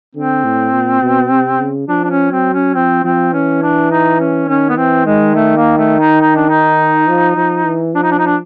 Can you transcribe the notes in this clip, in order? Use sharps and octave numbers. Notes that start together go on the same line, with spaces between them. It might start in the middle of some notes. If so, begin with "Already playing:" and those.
D3 C4
A2
A#2
B2
C3
C#3
F3 D4
D4
C#4
F#3 C4
C#4
F3 C4
F3 C4
E3 C#4
D4
D#4
C#4
D#3 C#4
B3
E3 C4
D#3 G#3
A3
A#3
A3
D#4
D#4
D4
D#4
F3
F3
E3
F3 D4
D#4
D4
D#4
D4